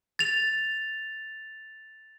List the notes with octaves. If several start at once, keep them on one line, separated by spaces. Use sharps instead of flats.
A6 F7